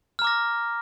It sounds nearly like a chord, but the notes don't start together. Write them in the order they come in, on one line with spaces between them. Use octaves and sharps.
F6 A#5 D6 A#6